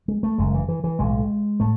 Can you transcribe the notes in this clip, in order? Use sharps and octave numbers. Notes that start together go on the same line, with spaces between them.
G#3
A3
F#1 F#2 C#3 G#3
E3
E3
E3
B1 A2 G#3
A2 A3